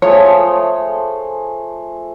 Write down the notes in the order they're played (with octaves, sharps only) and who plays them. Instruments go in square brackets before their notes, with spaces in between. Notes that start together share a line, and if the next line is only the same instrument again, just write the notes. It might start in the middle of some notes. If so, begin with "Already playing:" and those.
[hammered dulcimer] F3 A3 G#4 [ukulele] C#5